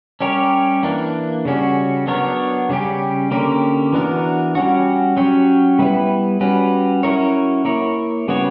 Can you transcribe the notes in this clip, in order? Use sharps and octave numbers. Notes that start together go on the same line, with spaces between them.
G3 C#4 G4 A#4 C#5
E3 A#3 D4
C#3 G3 C#4 F#4
F#3 B3 D4 A#4 C#5
C#3 G3 C#4 G4
D3 A#3 C#4 G4 A#4
E3 B3 D4 F#4 A#4
G3 C#4 F#4
F#3 C#4 G4 C#5
G3 B3 E4 B4
G3 C#4 F#4 B4
F#3 C#4 E4 A#4 C#5
A#3 E4 A#4 C#5
C#3 G3 B3 F#4 C#5